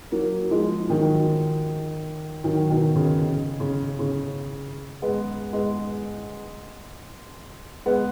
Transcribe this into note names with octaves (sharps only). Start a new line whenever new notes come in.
F#3 A#3
F3 G#3
D#3 F#3
D#3 F#3
B2 D#3
C#3
C#3
C#3
C#3
G#3 B3
G#3 B3
G#3 B3